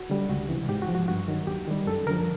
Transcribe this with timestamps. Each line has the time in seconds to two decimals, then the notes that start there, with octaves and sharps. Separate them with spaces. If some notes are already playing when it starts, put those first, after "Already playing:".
Already playing: F#4
0.10 D3 G3
0.29 C#2 F#4
0.49 C3 E3
0.69 G#2 G4
0.82 F#4
0.89 F3
0.95 F#4
1.08 G2 F#4
1.28 D#3 F#3
1.47 D#2 G4
1.68 D#3 G3
1.87 F#2 A4
2.07 D3 F3 A#4